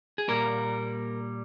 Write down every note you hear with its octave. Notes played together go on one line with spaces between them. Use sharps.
G#4
A#2 G3 A#3 A#4